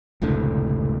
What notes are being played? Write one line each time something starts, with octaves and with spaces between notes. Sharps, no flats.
F1 C#2 A2 D3